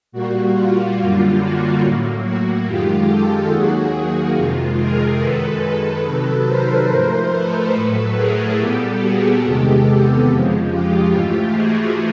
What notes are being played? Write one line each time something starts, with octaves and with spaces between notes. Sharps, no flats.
A#2 G3 A#3 F#4
F4
F#2 D3 G3 A#3
F#4
A2 F#3 A#3
F#4
F#2 D#3 G#3 F4 G4
G4 A4
D#2 D#3 F#3 A#3 F#4 G#4
F#4
F2 C3 D#3 G#3 F4
G#4 A#4
F#2 D#3 G#3 A4 B4
C3 D#3 F#3
A#4 C5
G#2 F3 A3
A4 B4
A2 F#3 A3
G#4 A#4
A#2 G3 B3 G4 A4
F#4 G#4
E2 C3 D#3 G#3 B3 G4 A4
G4 A4
F2 C#3 F3 G#3
F4 G4
G#2 E3 A3
F#4 G#4